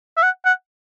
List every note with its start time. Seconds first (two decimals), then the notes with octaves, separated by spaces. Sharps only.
0.17 E5
0.23 F#5
0.45 F#5